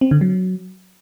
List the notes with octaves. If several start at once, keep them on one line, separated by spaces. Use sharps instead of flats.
C4
D3
F#3